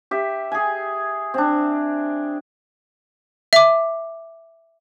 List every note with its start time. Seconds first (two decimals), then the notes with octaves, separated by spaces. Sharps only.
0.11 G4 E5
0.52 G#4 G#5
1.34 C4 D4
3.53 E5 D6